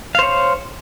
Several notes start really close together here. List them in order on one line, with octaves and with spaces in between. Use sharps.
F5 C5 C#5